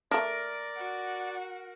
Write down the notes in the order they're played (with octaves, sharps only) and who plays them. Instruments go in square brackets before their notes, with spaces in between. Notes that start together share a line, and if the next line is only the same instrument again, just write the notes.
[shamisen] A3 D4 [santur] A#4 [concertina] D5
[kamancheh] F#4 F#5